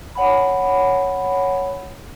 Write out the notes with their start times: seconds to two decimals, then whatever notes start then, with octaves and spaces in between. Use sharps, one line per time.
0.15 C#5 F#5 G#5 B5